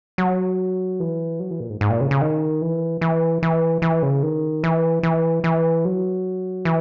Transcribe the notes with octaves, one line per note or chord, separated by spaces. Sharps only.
F#3
E3
F#3
E3
A#2
G#2
G#2
A#2
C#3
C#3
D#3
E3
E3
E3
E3
C#3
D#3
E3
E3
E3
F#3
E3